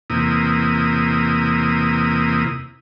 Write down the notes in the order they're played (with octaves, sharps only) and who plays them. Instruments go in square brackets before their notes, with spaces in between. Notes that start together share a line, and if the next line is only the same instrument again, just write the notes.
[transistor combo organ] E2 C3 A#3 E4 D#6